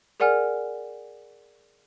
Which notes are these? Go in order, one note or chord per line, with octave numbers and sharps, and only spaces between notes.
G#4 A#4 D5 F#5 G#5 F6